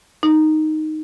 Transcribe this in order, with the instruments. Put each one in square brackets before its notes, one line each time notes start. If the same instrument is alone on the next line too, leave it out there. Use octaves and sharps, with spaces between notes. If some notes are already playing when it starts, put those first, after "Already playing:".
[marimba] D#4